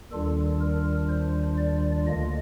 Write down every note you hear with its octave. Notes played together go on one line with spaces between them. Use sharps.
D#2 D#3 G3 D4 F4 A4
A#4
C5
D5
D2 D3 F3 A#3 D#5